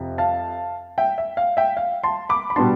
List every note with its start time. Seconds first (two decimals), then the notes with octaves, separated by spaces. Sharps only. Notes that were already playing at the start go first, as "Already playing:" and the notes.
Already playing: F2 C3 F3
0.18 F5 A5
0.98 E5 G5
1.18 E5
1.37 F5
1.57 E5 G5
1.77 F5
2.03 A5 C6
2.29 B5 D6
2.50 B5
2.56 B2 G3 B3 D4 A5 C6